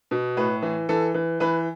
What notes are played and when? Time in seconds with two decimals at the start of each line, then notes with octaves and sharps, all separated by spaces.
0.11 B2
0.37 A2 B4
0.62 E3
0.89 E3 A4
1.14 E3
1.40 E3 B4